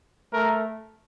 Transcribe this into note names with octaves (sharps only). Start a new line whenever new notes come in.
A3 A#4